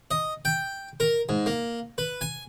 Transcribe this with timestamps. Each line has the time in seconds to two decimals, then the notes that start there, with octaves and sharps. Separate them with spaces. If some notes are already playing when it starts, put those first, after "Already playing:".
0.11 D#5
0.45 G5
1.00 A#4
1.29 G#2
1.46 A#3
1.98 B4
2.21 G#5